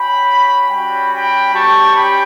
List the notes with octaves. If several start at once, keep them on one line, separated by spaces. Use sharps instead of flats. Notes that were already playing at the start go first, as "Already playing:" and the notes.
Already playing: C#4 F#4 G5 B5
G3 C#4 F#4 G5 B5
G5 B5
G3 C#4 G4 A5 C#6
G5 B5